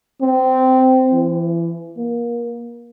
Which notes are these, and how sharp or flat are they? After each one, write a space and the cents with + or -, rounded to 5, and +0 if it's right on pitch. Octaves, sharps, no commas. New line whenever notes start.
C4 -15
E3 +30
A#3 +25